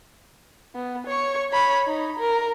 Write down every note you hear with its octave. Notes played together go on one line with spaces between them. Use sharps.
B3
C#5 C#6
C#5 B5
D#4
A#4